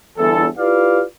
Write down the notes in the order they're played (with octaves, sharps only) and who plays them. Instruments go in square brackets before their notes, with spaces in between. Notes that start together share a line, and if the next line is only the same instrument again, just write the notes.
[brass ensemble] G1 E2 A4
E4 F4 G4 B4 D5 F5